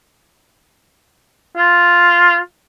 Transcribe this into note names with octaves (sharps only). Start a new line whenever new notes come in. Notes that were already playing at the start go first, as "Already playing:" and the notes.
F4